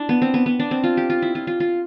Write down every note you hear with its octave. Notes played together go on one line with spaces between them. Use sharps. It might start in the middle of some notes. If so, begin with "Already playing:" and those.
Already playing: D4 E4
B3
C4
B3
B3
D4
C4
F4
G4
F4
E4
F4
F4
F4